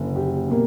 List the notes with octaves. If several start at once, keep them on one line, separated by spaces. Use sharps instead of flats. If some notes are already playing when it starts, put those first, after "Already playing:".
Already playing: F#1 D3 A#3
G4
B2 A#3